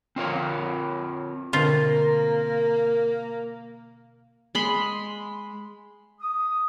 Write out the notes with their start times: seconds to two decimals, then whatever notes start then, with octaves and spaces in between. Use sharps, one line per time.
0.16 C4 F4 A#4 C#5
1.53 B2 D3 A#3 C4 F4 A#4
4.55 G#3 B5 C6
6.21 D#6